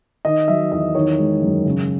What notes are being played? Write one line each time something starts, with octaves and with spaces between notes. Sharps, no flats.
D#3 D#5
F#3 E5
E2 D#5
D#3 C#5
G#3
F#2
C#3